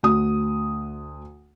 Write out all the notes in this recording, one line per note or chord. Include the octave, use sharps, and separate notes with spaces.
D2 F#4 D#6